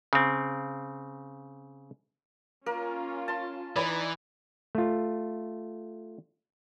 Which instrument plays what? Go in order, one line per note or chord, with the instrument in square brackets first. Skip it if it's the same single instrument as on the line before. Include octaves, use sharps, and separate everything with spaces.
[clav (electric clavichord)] C#3 C4
[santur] A#3 A#4 [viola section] C#4 F4
[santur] A5 C6
[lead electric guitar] E3 [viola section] D#4 [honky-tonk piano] B4 D5 B5
[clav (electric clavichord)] A3 F4